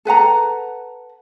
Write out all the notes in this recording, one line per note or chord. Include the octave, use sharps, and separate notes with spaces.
A4 B4 F#5 A#5